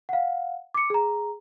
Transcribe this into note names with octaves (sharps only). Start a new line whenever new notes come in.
F5 F#5
D6 C#7
G#4 A#5